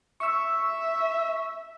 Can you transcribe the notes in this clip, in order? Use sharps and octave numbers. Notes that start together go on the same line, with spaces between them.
E5 C#6 E6